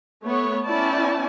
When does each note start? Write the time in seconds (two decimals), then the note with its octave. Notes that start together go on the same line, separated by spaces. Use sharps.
0.24 A3 B3 C#5
0.64 B3 C#4 E4 D5 G5 A5